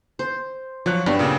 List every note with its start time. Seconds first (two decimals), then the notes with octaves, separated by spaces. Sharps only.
0.19 C5
0.86 F3 F#3 C#5 F#6
1.06 G2 B3 D4 G4
1.19 A#2 C#3 D5